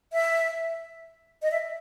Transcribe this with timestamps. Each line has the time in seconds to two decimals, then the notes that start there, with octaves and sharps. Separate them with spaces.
0.13 E5
1.42 D#5
1.51 E5